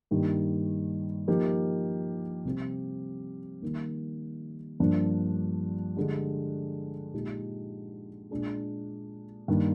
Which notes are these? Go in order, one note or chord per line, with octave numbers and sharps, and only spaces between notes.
G2 D#3 G3 A#3
F3 A#3 D#4 G4
C3 G3 C4 G4
D#3 G3 A#3
G2 F3 A#3 D4
D3 G#3 D4 G4
A#2 G#3 D#4 G4
A#2 G#3 D4 G#4
G2 D#3 A#3